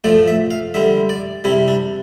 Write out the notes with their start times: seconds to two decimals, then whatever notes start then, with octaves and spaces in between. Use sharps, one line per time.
0.04 A2 F3 A3 D5
0.28 E5
0.51 F5
0.74 D3 G3 E5
1.09 D5
1.44 C3 G3 E4
1.68 D4